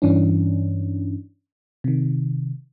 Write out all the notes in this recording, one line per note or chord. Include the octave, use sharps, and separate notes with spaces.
G2 E3 C#4 D4
C3 D#3